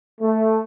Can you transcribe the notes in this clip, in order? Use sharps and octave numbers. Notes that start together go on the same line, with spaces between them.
A3